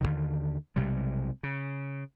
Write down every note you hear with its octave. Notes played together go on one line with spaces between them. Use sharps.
D#2 B2 D3 D#3
B1 C3 G3 G#3
C#3